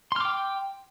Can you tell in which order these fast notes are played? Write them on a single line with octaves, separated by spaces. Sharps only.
C6 F6 D6 G5